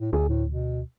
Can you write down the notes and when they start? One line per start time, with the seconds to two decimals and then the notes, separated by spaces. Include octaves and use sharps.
0.01 A2
0.13 D2 G#4
0.29 A2
0.50 B2